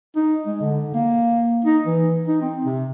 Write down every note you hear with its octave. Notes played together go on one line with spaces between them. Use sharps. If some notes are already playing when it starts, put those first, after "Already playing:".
D#4
G#3
D3
A#3
D#4
E3
D#4
C4
C3